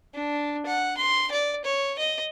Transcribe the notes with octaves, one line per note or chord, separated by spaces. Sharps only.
D4
F#5
C6
D5
C#5
D#5